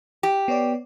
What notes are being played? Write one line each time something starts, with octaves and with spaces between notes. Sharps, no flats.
G4
B3 C#5 D5